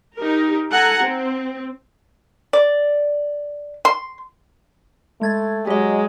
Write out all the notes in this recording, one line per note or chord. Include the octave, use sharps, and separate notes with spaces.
D#4 G4 A#4
A4 F#5 G#5 A#5
C4
D5
C6
G#3 A3 G#6 A6
F#3 G#3 G4 D#5